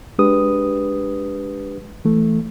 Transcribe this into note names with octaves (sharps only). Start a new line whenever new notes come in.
G#3 D4 G4 B4 D#6
E3 A3